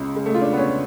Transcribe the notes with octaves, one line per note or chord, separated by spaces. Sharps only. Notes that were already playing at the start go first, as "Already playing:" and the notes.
Already playing: C#2 C#3 G#3
G#3
A3
F4
D4
B3
C#4